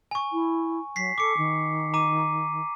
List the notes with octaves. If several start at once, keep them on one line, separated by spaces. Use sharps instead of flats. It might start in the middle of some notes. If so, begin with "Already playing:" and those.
G#5 C#6
E4
F#3 B6 C7
A4 D6 C#7
D#3
A#5 D6 D#7